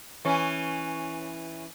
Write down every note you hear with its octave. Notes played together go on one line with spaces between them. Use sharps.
E3 C#4